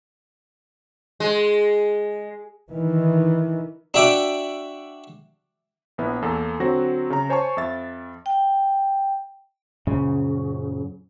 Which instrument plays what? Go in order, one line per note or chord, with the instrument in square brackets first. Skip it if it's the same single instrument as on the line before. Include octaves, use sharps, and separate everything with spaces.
[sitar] G#3
[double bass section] D#3 E3
[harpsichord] D4 F#4 E5 G5 D6
[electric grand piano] A#1 B3 E4
E2 A#3 A4
D3 F#3 C4 F#4 A#6
C#3 A#5
C5 C#5 G#5 A5 C#6
F2 E5 A6
[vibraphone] G5
[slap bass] F#2 A#2 F3 [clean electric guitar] C#3